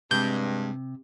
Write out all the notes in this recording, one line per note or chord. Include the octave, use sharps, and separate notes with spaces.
G2 C3 G#3 G6